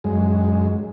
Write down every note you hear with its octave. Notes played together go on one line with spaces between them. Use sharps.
F#2 G#3